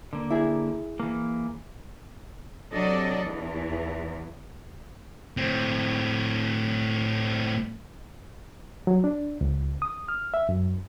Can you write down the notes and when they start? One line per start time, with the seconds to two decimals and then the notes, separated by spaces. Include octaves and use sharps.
0.13 D3 A#3
0.31 E4 G#4
1.00 E3 A#3
2.73 C3 F#3 D4 A4 D5 D#5
3.23 E2 E3
5.37 A2 C4
8.87 F#3
9.04 D4
9.41 C#2
9.82 D#6
10.09 F6
10.34 E5
10.49 F#2